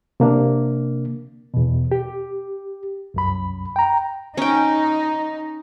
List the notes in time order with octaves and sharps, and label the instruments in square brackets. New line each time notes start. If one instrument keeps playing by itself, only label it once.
[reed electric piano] C3 A#3 D4
E2 B2
G4
C2 F#2 B5
G5 A#5
[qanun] C#4 G5 [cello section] D#4